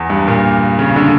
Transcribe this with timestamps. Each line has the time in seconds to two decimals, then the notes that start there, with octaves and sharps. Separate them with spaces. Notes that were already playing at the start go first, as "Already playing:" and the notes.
Already playing: E2
0.10 G2
0.28 A#2
0.79 C#3
0.96 D3